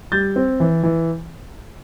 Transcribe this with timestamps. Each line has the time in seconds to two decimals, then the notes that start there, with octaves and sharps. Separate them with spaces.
0.12 G3 G6 A6
0.36 C4
0.60 E3
0.83 E3